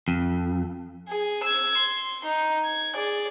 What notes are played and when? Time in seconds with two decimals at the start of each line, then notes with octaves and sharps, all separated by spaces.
0.08 F2
1.08 G#4
1.43 E6 G#6
1.77 C6
2.25 D#4
2.65 G#6
2.96 G#4 D5